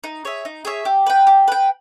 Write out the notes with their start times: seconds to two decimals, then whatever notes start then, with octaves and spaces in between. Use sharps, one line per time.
0.04 D#4
0.25 G#4 C#5 E5
0.45 D#4
0.65 G#4 C#5 E5
0.85 G4
1.06 B4 G5
1.27 G4
1.48 B4 G5